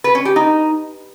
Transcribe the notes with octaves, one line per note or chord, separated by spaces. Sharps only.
B4
C#4
G4
D#4